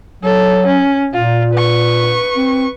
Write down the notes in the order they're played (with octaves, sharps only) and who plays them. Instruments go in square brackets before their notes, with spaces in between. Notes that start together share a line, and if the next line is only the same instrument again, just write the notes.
[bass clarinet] F#3 [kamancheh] A4
[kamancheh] C#4
[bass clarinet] A#2 [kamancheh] F4
[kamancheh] B4 C#6
[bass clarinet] C4